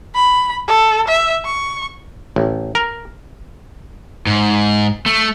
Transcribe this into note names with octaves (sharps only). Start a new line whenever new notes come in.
B5
A4
E5
C#6
A1
A#4
G#2
A3